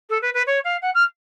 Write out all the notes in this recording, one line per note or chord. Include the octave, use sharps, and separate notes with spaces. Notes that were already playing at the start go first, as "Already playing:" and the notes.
A4
B4
B4
C#5
F5
F#5
F6